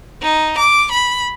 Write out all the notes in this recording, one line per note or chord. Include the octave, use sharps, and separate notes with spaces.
D#4
D6
B5